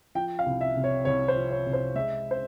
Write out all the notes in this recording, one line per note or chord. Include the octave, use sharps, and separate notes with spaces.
F3 G5
F5
C2
E5
C3
C#5
C2 C#5
C5
F3
C#5
C2
C5
G#3 E5
C5